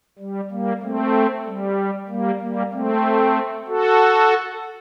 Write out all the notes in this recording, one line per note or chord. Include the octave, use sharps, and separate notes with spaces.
G3
G3 A#3
A3 C4
G3
G3 A#3
G3 A#3
A3 C4
F#4 A4